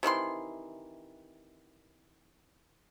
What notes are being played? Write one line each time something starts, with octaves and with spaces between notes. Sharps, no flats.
C3 D#3 E3 C6